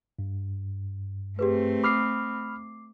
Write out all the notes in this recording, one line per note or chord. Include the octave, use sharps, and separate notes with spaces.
G2
A3 C4 G4 G#4 B4
B5 D6 D#6 F6 C7